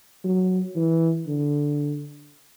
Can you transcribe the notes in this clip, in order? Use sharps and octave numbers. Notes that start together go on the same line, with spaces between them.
F#3
E3
D3